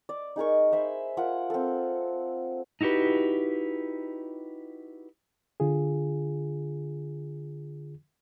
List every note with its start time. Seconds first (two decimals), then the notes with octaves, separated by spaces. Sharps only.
0.09 D5
0.36 D#4 G#4 A#4 C#6
0.72 C5 E5 B5 C6
1.17 F4 A#4 F#5
1.50 C4 A4
2.81 D#4 E4 F#4 G4 B4
5.60 D3 F4 G#4